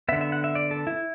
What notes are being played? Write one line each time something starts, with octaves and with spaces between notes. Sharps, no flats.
D3 B3 E5
E5
F#5
E5
D5
A4
E4